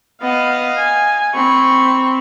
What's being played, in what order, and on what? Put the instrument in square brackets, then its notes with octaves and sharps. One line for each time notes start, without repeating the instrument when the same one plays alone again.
[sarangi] B3 [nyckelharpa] D#5 F5
[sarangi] G#5
[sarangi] C4 [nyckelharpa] B5 C#6